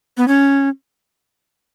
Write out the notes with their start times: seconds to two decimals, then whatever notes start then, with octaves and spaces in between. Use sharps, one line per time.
0.17 B3
0.28 C#4